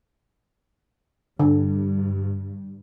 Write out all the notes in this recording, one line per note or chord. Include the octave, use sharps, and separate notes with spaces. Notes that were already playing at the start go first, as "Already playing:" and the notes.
G2 D3